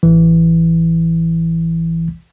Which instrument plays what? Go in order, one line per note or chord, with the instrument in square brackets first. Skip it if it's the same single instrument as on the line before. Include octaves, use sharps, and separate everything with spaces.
[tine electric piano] A1 E3